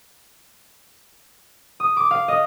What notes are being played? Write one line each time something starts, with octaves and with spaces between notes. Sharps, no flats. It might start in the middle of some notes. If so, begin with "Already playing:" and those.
D#6
D6
F5
D#5